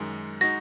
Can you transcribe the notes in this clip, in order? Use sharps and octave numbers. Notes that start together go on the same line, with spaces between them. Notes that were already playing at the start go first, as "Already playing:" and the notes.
Already playing: F#2 D#3 G#3
G#3 D#4 F#4 A#6